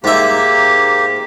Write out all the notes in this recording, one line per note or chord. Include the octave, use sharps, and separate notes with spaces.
G#2 A#3 G4 E5